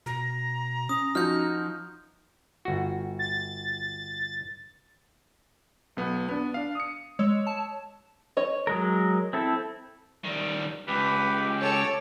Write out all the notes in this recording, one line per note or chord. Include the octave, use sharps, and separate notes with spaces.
B2 A#5
C#4 D#6
F3 D#4 F#4 F6 G6
G1 F#4
A6
B1 B3 F#5
B3 D4
D4 F5
D#6 C#7
G#3 C#5 E6
A5
C#5 D#5
F#3 G#3 A#4
C4 E4 A4
D#3 G3
C#2 G4 B4
A4 C#5 D6